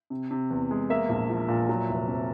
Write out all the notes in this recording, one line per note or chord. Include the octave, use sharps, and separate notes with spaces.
C3
C3
E2
G#3
A#3 E5
A#1
F3
A#2
F#3
F1
F2